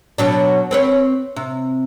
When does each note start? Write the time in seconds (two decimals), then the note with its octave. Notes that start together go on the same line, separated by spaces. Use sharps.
0.18 B2 F#3 D4
0.71 C4 B4 C#5
1.36 C3